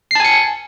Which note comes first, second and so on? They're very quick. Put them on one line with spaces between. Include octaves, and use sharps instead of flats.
C7 A5 G#5 C#7